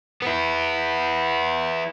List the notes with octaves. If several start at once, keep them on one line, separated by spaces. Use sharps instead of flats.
B3 E4